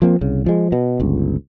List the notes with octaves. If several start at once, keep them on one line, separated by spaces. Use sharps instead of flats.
F3 A#3 C4
C2 C#3
F3 G#3
B2
G1 C#2